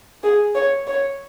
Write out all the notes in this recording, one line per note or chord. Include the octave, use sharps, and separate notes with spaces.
G#4
C#5
C#5